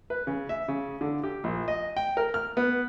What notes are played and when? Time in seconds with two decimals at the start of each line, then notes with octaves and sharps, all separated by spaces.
0.10 B4
0.27 C#3
0.49 E5
0.68 C#3
1.01 D3
1.23 G4
1.44 A#1
1.68 D#5
1.97 G5
2.17 A#4
2.34 F6
2.57 B3